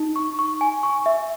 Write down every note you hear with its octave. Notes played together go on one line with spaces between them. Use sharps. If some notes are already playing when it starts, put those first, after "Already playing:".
Already playing: D#4
C#6
C#6
G#5
C#6
E5